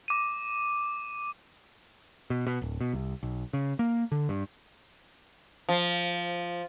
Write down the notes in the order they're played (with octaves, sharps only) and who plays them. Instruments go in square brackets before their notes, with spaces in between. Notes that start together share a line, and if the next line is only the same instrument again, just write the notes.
[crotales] D6 D#7
[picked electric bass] B2
B2
D1
B2
C2
B1
C#3
A#3
D3
G2
[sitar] F3